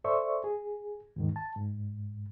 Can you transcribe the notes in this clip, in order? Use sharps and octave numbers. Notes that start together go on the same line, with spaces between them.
A4 C5 D5 E5 C#6
G#4
D#2 G#2 D#3
A5
G#2